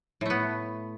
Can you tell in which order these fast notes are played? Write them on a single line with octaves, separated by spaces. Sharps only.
A2 A3 B3